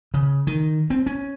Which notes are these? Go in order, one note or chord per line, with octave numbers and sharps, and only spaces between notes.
C#3
D#3
C4
C#4